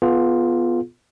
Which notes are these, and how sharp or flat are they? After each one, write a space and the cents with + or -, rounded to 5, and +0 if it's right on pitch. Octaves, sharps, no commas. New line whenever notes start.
B3 +0 F4 +0 G#4 +45